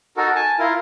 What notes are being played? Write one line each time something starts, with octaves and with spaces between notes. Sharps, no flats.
D#4 F#4 A4 A#4
G#5 A5
E4 F4 A#4